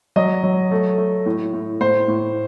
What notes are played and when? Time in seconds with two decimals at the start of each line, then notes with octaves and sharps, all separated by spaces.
0.16 F#3 D#5
0.44 F#3
0.71 A3
0.98 A3
1.26 A2
1.53 A2
1.81 A2 C5
2.08 A2